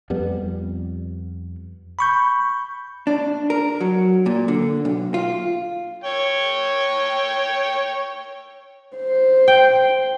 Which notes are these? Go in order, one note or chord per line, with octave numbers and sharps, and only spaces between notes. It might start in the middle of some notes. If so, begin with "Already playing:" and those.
F2 G3 B3
B5 C#6 G6
D4
A#4
F#3
A#2
D3
B1
F4
C#5 G5
C5
G5